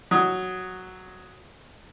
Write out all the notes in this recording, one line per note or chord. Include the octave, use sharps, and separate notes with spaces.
F#3 D#6